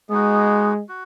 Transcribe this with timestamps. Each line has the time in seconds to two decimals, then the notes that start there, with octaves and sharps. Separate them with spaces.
0.10 G#3 B3 D#4 F#4
0.89 F#4